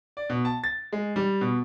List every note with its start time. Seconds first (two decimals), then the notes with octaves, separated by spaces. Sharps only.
0.17 D5
0.30 B2
0.45 A5
0.64 A6
0.92 G#3
1.16 G3
1.41 B2